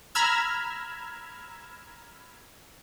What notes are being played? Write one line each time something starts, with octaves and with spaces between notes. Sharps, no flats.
A#5 B5 E6 F6 G#6